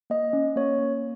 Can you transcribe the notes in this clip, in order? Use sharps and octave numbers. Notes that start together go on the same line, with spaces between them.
A#3 D#5
C#4
A#3 C#5
A#3